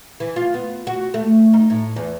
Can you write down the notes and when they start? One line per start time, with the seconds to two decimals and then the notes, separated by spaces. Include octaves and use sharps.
0.20 E3
0.36 F4
0.54 B3
0.87 F#4
1.14 A3
1.54 D#4
1.70 A2
1.96 E2